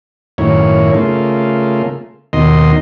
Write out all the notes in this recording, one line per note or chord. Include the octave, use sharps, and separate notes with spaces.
F#2 A2 D#3 A#3 E4 C#5
C#3 A3 A#3 F4
D#2 B2 D#3 D#5 C6